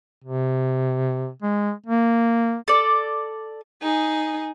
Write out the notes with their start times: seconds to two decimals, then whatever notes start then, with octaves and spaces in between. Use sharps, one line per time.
0.24 C3
1.42 G#3
1.86 A#3
2.68 A4 D5
3.82 D#4 G#4